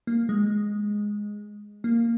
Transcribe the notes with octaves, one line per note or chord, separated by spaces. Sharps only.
A#3
G#3
A#3